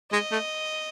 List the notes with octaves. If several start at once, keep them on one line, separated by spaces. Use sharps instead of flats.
G#3 D#5
A3